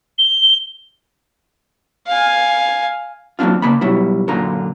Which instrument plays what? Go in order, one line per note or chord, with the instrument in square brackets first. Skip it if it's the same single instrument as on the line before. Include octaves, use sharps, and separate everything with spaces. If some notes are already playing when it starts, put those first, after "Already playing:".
[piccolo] G7
[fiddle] F5 G#5
[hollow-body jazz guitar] F#3 A#3 C4 D4 F4
C#3 A#3 B5
B2 F#3 G3 E4
F#2 A#2 D3 F4 A#5